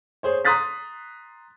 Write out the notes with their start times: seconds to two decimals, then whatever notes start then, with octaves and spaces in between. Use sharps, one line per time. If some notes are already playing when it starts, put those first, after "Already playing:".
0.23 G#4 C5 C#5
0.45 A#5 C6 D#6 F#6 A6 B6